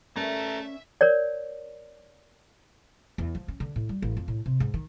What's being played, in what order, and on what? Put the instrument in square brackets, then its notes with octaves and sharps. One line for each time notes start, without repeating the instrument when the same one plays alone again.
[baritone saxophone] A3 [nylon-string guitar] C#4 A#4 D5 [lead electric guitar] A4 A#5 [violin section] E5
[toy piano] A#4 C#5 D5
[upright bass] E2
F3
C#4
D3
A2
G3
A1
F2
A2
C3
G#2
D#3